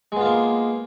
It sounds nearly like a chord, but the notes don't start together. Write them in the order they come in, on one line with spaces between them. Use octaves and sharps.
G#3 B3 F4 A#3